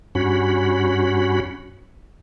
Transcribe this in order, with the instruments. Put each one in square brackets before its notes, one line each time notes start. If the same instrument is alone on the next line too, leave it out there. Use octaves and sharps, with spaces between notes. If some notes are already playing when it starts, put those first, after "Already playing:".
[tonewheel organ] G2 C#4 F#4 B5